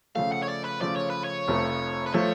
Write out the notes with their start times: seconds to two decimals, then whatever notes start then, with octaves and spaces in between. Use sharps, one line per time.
0.15 C#3 F3 A3 F5
0.32 F#5
0.43 C#5
0.49 D5
0.65 B4
0.81 C#3 F3 A3 D5
0.96 C#5
1.10 B4
1.24 C#5
1.48 F1 F2 F3 A3
2.06 B4
2.14 F3 A3 C#5